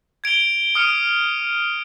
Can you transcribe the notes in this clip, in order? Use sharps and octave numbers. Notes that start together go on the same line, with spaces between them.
G#6 D7 F7 G7
D#6 F6 C#7 D#7